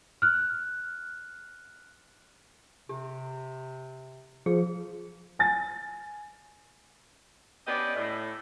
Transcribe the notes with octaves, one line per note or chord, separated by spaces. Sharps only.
F6 F#6
C3 G4
F3 G#4
G#5 A6
B3 C#4 D4 G4 D#5
A2